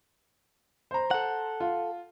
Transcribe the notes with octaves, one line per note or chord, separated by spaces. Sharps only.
C5 A#5
A4 F#5
F4